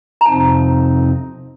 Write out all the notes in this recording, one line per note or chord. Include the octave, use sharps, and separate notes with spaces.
A#5
F2 C3 F3 C4 D#4 A5